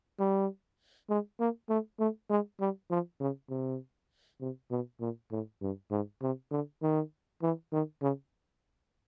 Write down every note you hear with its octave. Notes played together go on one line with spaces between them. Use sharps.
G3
G#3
A#3
A3
A3
G#3
G3
F3
C#3
C3
C3
B2
A#2
A2
G2
G#2
C3
D3
D#3
E3
D#3
C#3